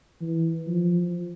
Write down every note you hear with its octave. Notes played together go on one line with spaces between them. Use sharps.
E3
F3